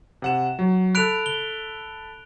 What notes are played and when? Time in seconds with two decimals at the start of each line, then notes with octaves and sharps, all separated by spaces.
0.22 C3 F#5 E7
0.59 F#3
0.95 A4 B5 F#6 D7 F7
1.26 G7